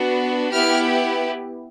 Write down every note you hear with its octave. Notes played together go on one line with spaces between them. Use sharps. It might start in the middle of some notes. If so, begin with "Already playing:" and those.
Already playing: B3 D4 F#4
B3 E4 G4 F6